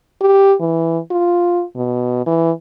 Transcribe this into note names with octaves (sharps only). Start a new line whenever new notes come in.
G4
E3
F4
B2
E3